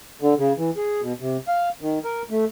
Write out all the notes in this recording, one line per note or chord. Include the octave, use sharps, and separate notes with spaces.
D3
C#3
E3
G#4
B2
C3
F5
D#3
A#4
A3